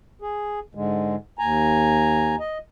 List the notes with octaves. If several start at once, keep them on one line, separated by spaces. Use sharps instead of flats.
G#4
G#2 D3 G#3
D#2 G#5 A#5
D#5